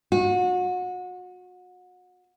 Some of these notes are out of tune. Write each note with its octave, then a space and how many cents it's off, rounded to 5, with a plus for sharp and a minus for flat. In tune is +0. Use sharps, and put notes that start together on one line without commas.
F#4 -30